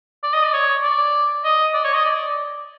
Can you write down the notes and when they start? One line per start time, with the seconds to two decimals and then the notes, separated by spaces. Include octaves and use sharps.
0.23 D5
0.34 D#5
0.44 D5
0.53 C#5
0.83 D5
1.45 D#5
1.74 D5
1.84 C#5
1.94 D#5
2.05 D5